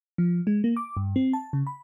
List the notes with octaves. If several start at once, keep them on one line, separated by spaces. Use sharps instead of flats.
F3
G#3
A#3
D6
G2
C4
A5
C#3
B5